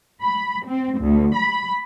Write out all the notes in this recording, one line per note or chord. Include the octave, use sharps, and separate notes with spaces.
B5
C4
D2
B5